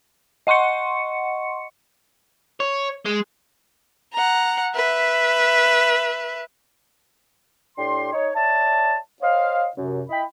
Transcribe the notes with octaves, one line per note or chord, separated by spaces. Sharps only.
D#5 F#5 C6 C#6 C#7
C#5
G#3
F#5 A#5
B4 E5
A2 D4 G4 C6
D#4 C#5
C#5 D5 E5 A5
C5 C#5 D#5 F5
F#2 C3
E4 D#5 G5 B5